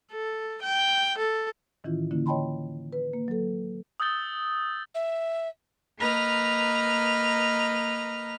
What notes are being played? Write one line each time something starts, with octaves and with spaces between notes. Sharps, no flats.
A4
G5
A4
A2 D#3 E3 C#4 E4 F4
D3 A#3 C#4 E4
C#5 D#5 G5 A5 B5 C6
B4
A#3
F#3 A4
D#6 E6 G6 A6 G7
E5
A#3 B4 D#5 A#5 F6